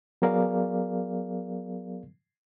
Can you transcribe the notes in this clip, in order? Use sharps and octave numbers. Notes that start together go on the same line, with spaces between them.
F#3 B3 G#4 A#4 D5 F5